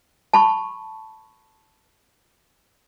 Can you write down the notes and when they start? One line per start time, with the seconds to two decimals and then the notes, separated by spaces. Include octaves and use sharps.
0.33 A5 B5 C#6